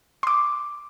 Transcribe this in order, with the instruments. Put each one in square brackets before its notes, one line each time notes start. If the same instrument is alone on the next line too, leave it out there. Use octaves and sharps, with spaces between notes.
[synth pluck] C6 D6